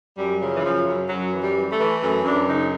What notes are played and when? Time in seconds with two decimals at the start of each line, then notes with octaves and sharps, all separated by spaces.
0.17 F#2 G3
0.40 C#3 F3
0.56 E3
0.64 F#2 F3
0.86 F#2 F#3
1.09 F#2 F#3
1.32 E3
1.40 G3
1.55 E3
1.70 A3
1.79 E3
2.01 F#2 A3
2.24 F#2 D4
2.47 C#3 D#4